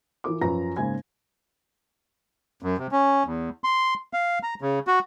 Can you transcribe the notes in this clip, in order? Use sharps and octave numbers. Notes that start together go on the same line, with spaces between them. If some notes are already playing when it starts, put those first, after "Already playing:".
E3 F4 A#4 D6
F#2 F3 B4 A#5 A#6
G#2 C#3 A#3 C5 G#5 G#6
F#2
C3
C#4
E2
C6
F5
A#5
C#3
F#4